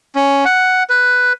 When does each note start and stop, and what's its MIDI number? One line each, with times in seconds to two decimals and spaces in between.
0.15 0.44 61
0.45 0.83 78
0.90 1.33 71